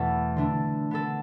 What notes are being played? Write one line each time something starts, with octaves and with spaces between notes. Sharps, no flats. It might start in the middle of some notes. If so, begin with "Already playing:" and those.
Already playing: E2 B2 A3 A4
D3 A3 D4
D3 B3 D4 A4